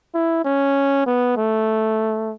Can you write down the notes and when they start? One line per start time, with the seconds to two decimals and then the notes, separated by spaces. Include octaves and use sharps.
0.14 E4
0.45 C#4
1.07 B3
1.37 A3